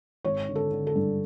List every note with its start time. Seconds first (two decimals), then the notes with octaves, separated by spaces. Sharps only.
0.25 G#1 C#5
0.49 D3
0.55 A4
0.72 D3
0.87 A4
0.96 G2